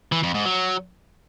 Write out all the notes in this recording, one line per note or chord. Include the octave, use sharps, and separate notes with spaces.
E3
F2
G#2
F#3